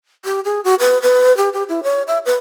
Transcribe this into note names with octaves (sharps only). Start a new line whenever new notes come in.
G4
G#4
F#4
B4
B4
G4
G4
E4
C#5
E5
B4